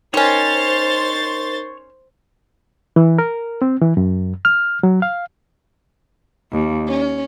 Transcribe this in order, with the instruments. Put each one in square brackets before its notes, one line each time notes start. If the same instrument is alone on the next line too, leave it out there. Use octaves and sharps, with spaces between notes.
[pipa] G3 C#4 [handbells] D#4 A#4 D#5 [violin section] C5 A6 [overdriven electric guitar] C#5
[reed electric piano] E3
A#4
C4
E3
F#2
F6
F#3
F5
[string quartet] D#2
C#4